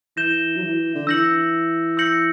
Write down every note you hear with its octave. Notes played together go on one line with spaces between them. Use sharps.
E3 G6 A#6 E7 G7
F#3
E3
D3
E3 E6 G6 A#6 C#7 F#7
E6 G6 A#6 C#7 F#7